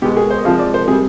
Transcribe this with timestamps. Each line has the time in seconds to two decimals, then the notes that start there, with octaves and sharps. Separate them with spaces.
0.02 B2 G4
0.05 G#3
0.17 G#4
0.31 C5
0.38 D#5
0.44 C3 F3 G#3 F5
0.59 D5
0.74 C5
0.88 C3 G#4
0.92 G3